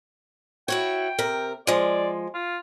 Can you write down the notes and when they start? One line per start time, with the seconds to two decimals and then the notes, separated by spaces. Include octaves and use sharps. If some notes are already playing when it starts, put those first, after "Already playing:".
0.68 E4 F#4 C#5 G5
1.19 C3 A#4
1.67 F3 G#3 D5
2.34 F4